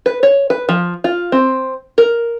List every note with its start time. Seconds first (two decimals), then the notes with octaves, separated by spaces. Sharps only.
0.06 B4
0.23 C#5
0.50 B4
0.69 F3
1.04 F4
1.32 C4
1.98 A#4